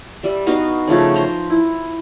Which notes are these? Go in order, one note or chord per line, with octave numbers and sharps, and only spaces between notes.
G3 E5
B3 D#4 F#4 F5
C#3 F3 A3 C#4
C5 A#5
E4